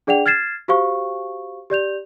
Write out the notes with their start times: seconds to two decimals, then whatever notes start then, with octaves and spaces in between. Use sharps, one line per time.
0.07 D4 G#4 D5 F#5 G5 F7
0.26 F6 G#6 A6 C7 E7
0.68 F#4 G4 C5 F5 C#6
1.70 G4 D5 G6 F7